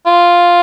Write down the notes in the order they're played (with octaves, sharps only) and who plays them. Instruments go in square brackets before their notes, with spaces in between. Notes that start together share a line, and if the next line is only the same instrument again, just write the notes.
[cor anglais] F4